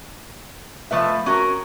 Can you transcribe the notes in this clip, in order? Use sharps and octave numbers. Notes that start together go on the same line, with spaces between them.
F3 A3 B4 E5
C#4 F#4 A#4